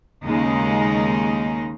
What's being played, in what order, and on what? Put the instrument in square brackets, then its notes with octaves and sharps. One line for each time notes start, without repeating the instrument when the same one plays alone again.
[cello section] D#2 C#3 G#3 D#4